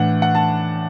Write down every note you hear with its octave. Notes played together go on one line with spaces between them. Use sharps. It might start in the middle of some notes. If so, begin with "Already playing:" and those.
Already playing: A2 E3 D4 F#5
F#5
A5